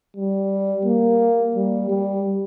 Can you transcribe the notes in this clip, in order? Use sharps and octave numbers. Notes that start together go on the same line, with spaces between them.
G3
A#3
G3
G3